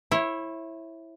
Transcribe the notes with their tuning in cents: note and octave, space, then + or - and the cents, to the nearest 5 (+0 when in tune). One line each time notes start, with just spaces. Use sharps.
E4 +0 C#5 -35